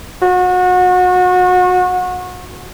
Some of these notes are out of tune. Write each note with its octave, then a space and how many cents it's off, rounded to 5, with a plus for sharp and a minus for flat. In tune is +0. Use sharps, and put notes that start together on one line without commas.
F#4 -30